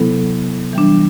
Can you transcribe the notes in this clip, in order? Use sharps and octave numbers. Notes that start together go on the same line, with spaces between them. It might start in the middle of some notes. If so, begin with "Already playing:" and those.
Already playing: C3 F#3 B3 E4 A4
E3 G3 D4